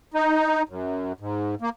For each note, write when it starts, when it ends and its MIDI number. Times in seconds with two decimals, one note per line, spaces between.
0.14 0.63 63
0.69 1.13 42
1.20 1.55 44
1.61 1.69 58